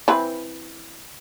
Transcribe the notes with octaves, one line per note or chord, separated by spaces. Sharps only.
E3 C4 B4